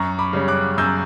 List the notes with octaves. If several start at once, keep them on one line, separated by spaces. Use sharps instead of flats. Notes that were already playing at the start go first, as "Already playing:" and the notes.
Already playing: F#2 A#5 C#6
B5 D6
C#3 G3 C#4
D6 F#6
F#2 E6 G6